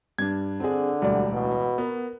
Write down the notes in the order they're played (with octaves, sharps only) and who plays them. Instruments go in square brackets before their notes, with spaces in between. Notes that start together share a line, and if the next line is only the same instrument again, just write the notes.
[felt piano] G2 [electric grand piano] D4 G#6
[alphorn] D3 [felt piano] C4 G#4
[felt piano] E1 D2 D5 [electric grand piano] G3
[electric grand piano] A1 [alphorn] B2
[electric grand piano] B3 [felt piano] A#4